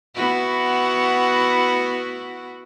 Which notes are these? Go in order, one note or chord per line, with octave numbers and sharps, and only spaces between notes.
B3 E4 F#4